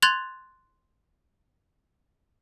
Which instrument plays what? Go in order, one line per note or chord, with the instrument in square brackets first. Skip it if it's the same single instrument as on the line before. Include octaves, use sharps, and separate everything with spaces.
[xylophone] C6 F#6 G#6 A6 F7 F#7